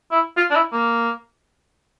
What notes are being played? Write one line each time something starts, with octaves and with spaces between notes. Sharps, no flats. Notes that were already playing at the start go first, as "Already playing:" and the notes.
E4
F4
D4
E4
A#3